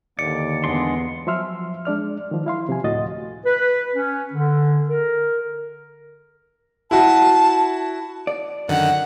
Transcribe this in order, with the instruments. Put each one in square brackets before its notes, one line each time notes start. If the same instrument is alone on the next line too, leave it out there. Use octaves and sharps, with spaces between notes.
[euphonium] D#2 [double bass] D3 [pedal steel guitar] D5 [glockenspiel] C#7
[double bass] E2 B3 [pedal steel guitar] G#3 D4 C6
[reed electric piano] F3 F#3 E5 C6 E6 F6
G#3 D4 D5 F6
D#3 F3
E4 F5 C6
C3 F3 G#5
D2 A2 F#4 D#5 A6
[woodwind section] B4
C#4
D3
A#4
[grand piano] E4 F#4 [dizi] A5
[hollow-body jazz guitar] D5
[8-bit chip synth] F#2 D3 D#3 [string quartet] F#5